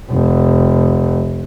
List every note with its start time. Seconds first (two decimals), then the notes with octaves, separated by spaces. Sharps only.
0.10 F1